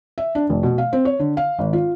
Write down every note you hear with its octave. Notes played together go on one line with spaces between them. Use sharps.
E5
D4
F1
B2
F5
C4
C#5
D3
F5
G#1
F4